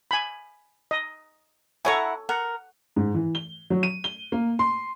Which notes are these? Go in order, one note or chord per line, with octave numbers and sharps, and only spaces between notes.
G#5 B5
D#5
E4 A4 C#5 F#5 G#5 A#5
A#4 F#5
G#2
E3
G7
F#3
D#7
G7
A#3
C6